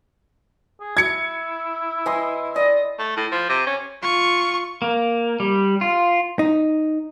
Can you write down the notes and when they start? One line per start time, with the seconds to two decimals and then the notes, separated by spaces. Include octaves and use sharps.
0.80 G#4
0.97 E4 G#6 C#7
2.06 E3 D#5 C6
2.56 D5 D#5
2.99 A3
3.17 A2
3.32 F3
3.49 C3
3.67 C#4
4.02 F4 C#6
4.82 A#3
5.40 G3
5.81 F4
6.39 D#4